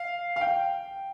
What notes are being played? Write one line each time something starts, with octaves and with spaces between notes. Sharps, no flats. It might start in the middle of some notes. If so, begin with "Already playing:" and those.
Already playing: F5
F5
G5